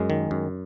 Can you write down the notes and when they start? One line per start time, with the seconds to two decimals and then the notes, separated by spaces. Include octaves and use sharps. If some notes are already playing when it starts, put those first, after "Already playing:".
Already playing: F#2 G#3
0.10 D#3
0.31 F#2